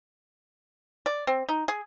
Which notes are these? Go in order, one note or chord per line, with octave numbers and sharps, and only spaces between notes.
D5
C4
D#4
G#4